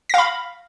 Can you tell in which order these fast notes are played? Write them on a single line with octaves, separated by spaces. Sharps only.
A#6 F5 B5